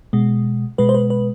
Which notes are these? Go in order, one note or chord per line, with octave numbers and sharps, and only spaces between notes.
B2 G#3
B2 G#3 B4
C5
B4
B4